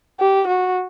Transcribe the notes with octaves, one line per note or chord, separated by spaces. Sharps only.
G4
F#4